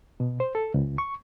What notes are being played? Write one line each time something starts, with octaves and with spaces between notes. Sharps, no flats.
B2
C5
A4
C#2
C#6